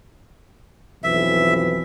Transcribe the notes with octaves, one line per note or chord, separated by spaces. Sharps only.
B1 F2 E3 E5